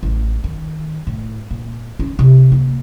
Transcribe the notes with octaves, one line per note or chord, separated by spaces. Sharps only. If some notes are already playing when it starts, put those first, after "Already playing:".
A1
D#3
A2
A#2
C#4
C3
A#3